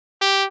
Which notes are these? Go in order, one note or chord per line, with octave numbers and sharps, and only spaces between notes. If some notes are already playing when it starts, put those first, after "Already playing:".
G4